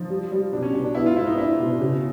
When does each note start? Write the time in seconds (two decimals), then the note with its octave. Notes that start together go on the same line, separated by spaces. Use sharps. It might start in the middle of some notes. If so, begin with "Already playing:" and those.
Already playing: F3 D#4
0.10 G3
0.32 G3
0.52 B2 D4
0.63 C#4
0.73 B2 D4
0.84 D4
0.95 B3 E4
1.06 F4
1.16 G#2 E4
1.27 D#4
1.37 D4 E4
1.59 B2
1.79 C#3